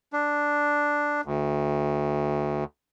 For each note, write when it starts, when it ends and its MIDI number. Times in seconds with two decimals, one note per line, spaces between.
0.13 1.21 62
1.25 2.64 38